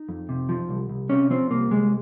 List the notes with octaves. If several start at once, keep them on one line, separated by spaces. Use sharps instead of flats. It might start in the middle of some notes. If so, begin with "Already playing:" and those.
Already playing: D#4
F2
C3
F3
C2
C2
C3 C#4
F3 C4
C2 A#3
C2 G#3